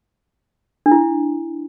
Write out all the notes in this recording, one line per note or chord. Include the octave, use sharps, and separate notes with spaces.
D4
E4